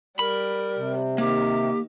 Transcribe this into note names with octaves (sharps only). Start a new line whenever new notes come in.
G3 A#4 B5
C3
D#3 A#3 G4